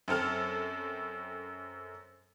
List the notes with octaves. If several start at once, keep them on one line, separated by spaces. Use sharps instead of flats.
F#2 C4 A4 F6